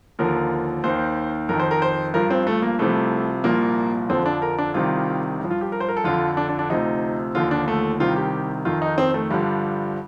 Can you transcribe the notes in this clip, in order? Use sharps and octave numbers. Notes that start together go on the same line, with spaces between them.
D#2 D3 F3 A#4
D#2 D#3 C5
F2 D#3 A#4
C5
A#4
C5
G2 F3 A#4
C4
A3
A#3
C2 C3 F3 A3
C2 A#2 F3 A#3
F2 D3 F3 C4
D4
A#4
D4
C2 C3 D#3 F4
G2 F3
F4
G4
A#4
C5
A#4
A4
F2 D3 F3 F4
D4
D4
D4
D2 C3 F3 D#4
D#2 D3 F3 F4
D4
A3
C2 C3 D#3 F4
G4
F2 D#3 F4
D#4
C4
A3
G2 D3 F3 G3